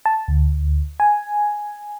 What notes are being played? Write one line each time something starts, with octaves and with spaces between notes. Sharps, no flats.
A5
D2
G#5